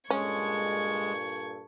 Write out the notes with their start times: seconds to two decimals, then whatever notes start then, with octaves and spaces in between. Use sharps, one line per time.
0.10 G2 A#2 G#3 C#4 A4 C#6 G#6